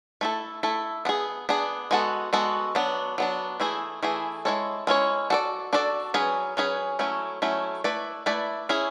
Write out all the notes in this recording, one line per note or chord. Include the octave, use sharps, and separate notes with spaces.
A3 E4 A4
A3 E4 A4
B3 D4 G#4
B3 D4 G#4
G#3 B3 F#4 A4
G#3 B3 F#4 A4
F#3 B3 D4
F#3 B3 D4
E3 A3 E4 G#4
E3 A3 E4 G#4
G#3 C#4 E4 A4 C#5
G#3 C#4 E4 A4 C#5
D4 F#4 A4 D5
D4 F#4 A4 D5
F#3 C#4 G#4 B4
F#3 C#4 G#4 B4
F#3 A3 C#4 E4
F#3 A3 C#4 E4
A3 E4 B4 D5
A3 E4 B4 D5
C#4 E4 G#4